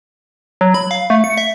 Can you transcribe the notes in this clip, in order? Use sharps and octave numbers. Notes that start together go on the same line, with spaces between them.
F#3
B5
F5
A3
C#7
E5